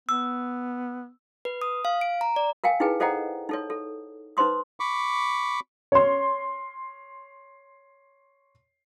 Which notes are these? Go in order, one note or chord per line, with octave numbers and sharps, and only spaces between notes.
B3 E6
B4
D#6
F5
D7
A#5
D5
A#4 F5 G5 G#5
D#4 E4 G#4 B4 G5 G#5
A4 C5 D#5 F#5 G5 A#5
D#4 A4 C#5
A4
D#4 B4 C5 C6 D#6
B5 C#6 D6
C#5 C6